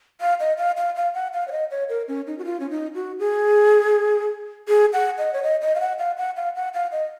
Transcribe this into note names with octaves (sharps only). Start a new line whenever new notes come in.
F5
D#5
F5
F5
F5
F#5
F5
C#5
D#5
C#5
A#4
C#4
D#4
F#4
F4
C#4
D#4
F#4
G#4
G#4
F#5
D#5
C#5
D#5
D#5
F5
F#5
F5
F#5
F5
F#5
F5
D#5